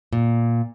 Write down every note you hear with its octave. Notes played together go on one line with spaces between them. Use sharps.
A#2